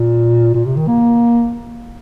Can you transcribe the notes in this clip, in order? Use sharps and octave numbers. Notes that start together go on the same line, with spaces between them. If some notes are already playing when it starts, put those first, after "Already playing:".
Already playing: A#2
A#2
C3
D#3
A#3